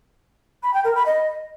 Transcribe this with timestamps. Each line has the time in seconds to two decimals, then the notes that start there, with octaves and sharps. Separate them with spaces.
0.63 B5
0.74 G5
0.84 A#4
0.95 B5
1.06 D#5